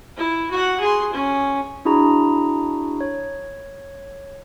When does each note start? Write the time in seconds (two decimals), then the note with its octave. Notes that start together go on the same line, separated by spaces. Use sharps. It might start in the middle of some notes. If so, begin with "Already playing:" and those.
0.17 E4
0.51 F#4 F#5
0.80 G#4 C6
1.13 C#4
1.85 D4 E4 F#4 G#4 A#5
3.01 C#5